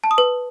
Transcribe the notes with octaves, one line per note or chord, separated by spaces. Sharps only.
A5
D#6
B4